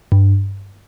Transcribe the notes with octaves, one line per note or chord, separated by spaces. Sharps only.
G2